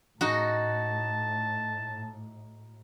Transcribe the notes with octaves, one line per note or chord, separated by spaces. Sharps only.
A2 D#4 F#4 A5